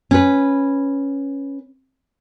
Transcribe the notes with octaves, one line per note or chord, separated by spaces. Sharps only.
C#4 B4